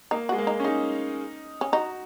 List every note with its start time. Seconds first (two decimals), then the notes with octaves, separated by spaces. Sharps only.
0.11 A#3 D#4
0.29 F#4
0.33 G#3
0.38 A#3
0.47 D#4
0.60 C#4
0.64 G#3 D#4
1.61 C#4
1.72 D#4 F#4